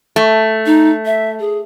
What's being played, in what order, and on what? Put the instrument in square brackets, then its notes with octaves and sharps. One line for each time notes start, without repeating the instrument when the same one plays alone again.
[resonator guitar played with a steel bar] A3
[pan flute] D#4
E5
G#4